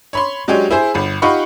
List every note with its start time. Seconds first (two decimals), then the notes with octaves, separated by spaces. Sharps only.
0.13 C#5 B5 C6
0.48 F#3 G#3 D4 G4 C#5
0.71 E4 G#4 C5
0.94 G1 B5
1.22 D#4 F4 G4 F#5 B5 C#6